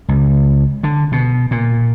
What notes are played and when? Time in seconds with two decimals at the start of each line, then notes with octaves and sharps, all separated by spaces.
0.09 C#2
0.83 D3
1.12 B2
1.51 A#2